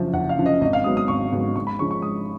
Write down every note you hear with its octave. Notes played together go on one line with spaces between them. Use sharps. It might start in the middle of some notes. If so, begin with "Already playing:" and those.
Already playing: F#1 F#2 F3
F#1 F#5
F5
F#2 F3
D#5
G#1 D#5
F5
G#2 F#3 B3 D#6
D#6
G#1 C#6
G#2 F#3 B3
G#2 C#6
B5
F3 G#3 C#4 C#6
C#6
G#2 D#6